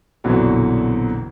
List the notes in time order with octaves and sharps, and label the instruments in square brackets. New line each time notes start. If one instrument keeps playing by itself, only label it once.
[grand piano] A#1 F2 B2 D3 E3 F#3